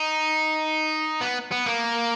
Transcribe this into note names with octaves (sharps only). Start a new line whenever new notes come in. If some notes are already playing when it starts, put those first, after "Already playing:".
Already playing: D#4
B3
B3
A#3